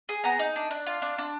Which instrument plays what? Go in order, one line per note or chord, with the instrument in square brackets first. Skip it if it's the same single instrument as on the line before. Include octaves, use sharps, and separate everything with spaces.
[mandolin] G#4 G#5
B3 A#5
D#4
D4
D4
F4
D4
D4